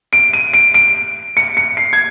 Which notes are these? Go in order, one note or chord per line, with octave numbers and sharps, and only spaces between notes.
D7
D#7
D7
D7
C#7
C#7
C7
G#6